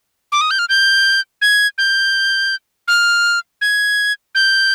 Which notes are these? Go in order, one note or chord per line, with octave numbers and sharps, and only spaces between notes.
D6
D#6
G6
F6
G6
G#6
G6
F6
G#6
G6